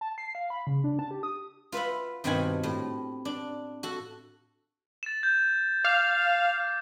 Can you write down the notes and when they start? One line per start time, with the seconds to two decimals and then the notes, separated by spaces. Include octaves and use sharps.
0.01 A5
0.18 C7
0.35 F5
0.50 B5
0.67 C#3
0.84 D4
0.99 A5
1.11 G4
1.23 D#6
1.72 F4 B4 E5 F#5
2.24 G2 B2 D#3 C4 F#5 G#5
2.63 A2
3.25 D4
3.83 F#4 A4
5.03 A6 E7
5.23 G6
5.84 F5 D6